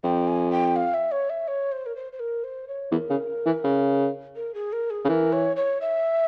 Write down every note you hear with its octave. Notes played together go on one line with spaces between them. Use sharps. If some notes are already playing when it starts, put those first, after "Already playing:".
F2 G5
G#5
G5
F5
E5
C#5
E5
C#5
C5
A#4
C5
C5
A#4
C5
C#5
E2 A#4
C#3
E3
C#3
A#4
G#4
A#4
G#4
C#3
E3 A#4
C#5
C#5
E5